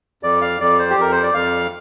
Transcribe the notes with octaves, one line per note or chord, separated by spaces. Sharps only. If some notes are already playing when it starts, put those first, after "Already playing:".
F2 D5
F5
F2 D5
C5
G4
F2 A#4
C5
D5
F2 F5